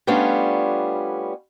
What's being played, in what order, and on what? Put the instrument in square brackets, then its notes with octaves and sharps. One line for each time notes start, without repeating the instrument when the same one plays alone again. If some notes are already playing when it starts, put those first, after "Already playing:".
[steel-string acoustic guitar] G3 A3 B3 C#4 D4 F4